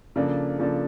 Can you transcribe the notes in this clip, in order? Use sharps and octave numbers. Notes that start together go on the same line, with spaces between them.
C#3 F3 A#3 D4 A4
C#3 F3 A#3 D4 A4